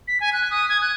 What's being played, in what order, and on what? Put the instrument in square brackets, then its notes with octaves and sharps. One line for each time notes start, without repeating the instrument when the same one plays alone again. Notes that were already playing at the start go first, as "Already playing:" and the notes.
[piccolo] B6
G#5
F#6
D#6
G#6
F#6